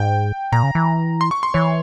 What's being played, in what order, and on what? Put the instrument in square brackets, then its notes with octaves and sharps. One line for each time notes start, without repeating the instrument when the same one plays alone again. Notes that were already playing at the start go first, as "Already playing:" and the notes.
Already playing: [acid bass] G#2 [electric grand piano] G5
[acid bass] A#2 [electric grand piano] A#5
[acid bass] C#3
E3
[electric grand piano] C6
C#6
C6
[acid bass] E3 [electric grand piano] C#5